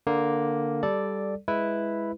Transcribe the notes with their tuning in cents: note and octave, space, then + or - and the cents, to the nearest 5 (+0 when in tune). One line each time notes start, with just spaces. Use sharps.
D3 +0 A#3 +0
G3 +0 A4 -5 D5 +0
G#3 +0 E4 +0 B4 +0